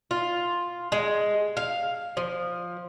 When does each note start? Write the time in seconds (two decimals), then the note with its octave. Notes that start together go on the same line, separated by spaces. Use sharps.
0.11 F4
0.92 G#3
1.57 F5
2.17 F3